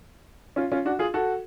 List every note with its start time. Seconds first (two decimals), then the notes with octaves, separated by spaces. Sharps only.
0.56 C#4 F4
0.72 C#4 F4
0.85 D4 F#4
0.99 F4 G#4
1.14 F#4 A4